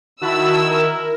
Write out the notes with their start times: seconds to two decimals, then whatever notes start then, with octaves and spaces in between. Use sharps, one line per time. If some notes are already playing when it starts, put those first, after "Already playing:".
0.22 D#3 E4 F#4 A5 B5 E6
0.70 A#4